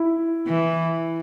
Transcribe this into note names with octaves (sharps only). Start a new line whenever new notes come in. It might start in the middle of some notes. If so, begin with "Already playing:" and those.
Already playing: E4
E3